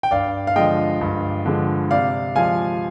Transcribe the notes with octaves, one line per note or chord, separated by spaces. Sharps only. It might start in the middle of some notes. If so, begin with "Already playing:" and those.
G5
G2 D5 F5
F5
D3 F3 G#3 D#5 G5
G2
D3 F3 G#3
C3 D5 F5
F3 G#3 F5 G#5